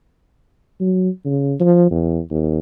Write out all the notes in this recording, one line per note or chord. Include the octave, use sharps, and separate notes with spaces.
F#3
C#3
F3
E2
D#2